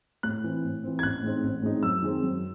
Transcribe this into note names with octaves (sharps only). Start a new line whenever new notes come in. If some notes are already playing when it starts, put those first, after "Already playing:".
A2 F#6
E3 C4
A2
E3 C4
G#6
A1 F#6
A2 G#3 C4 D#4
A1
A2 G#3 C4 D#4
F#2 E6
D#3 G#3 C4
F#2